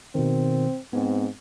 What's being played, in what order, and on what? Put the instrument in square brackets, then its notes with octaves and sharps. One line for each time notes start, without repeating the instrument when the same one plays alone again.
[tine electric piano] B2 D#3 [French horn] C4
[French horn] G#2 [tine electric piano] B3 C4